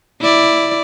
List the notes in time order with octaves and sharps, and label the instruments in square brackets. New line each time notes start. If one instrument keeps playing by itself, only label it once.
[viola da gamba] E4 D5